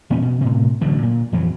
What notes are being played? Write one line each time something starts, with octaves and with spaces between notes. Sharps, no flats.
E2 A#2 B3 C#4
B2
A2 C3
A1 D3 F#3
A#2
F2 E3 F#3